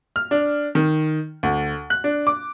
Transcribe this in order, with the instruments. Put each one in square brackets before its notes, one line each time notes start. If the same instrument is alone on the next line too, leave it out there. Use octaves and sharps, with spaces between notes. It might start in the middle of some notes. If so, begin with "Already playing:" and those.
[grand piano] F6
D4
D#3
D2
F#6
D4
D6